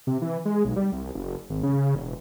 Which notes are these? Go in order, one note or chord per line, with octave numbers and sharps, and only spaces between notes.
C3
E3
G#3
B1
G3
C2
F#1
G#1
C#3
E1